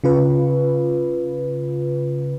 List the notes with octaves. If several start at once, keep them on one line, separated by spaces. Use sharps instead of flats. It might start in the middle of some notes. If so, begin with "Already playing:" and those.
C#3 F4 B4